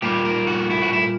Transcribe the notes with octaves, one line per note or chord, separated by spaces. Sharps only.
A#2 G3 A#3 G4
A#4
F#4
E4
F#4
E4